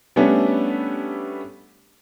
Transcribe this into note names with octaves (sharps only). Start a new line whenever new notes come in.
G3 A3 B3 C#4 D4 A4